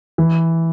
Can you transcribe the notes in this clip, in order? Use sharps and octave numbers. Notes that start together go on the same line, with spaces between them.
E3